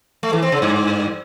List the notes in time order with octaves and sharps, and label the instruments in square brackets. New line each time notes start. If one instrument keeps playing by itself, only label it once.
[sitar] A3
E3
C4
C#3
G2